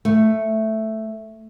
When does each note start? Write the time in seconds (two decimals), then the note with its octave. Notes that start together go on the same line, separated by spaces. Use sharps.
0.05 A3